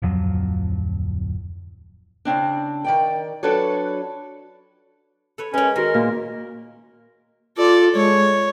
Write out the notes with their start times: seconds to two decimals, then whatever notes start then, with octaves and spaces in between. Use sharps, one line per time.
0.02 D1 F2 F3 F#3
2.25 C#3 A#3 C4 D4
2.84 D#3 D5 G5
3.43 F#3 D4 F#4 A4 B4 C#5
5.38 A4 B4 C#5
5.54 G#3 C#4 A#4 B4 C#5
5.76 D#3 F#4 A#4 G#5
5.94 A#2 F4 F#4
7.57 F4 A4 D5
7.95 G#3 C#5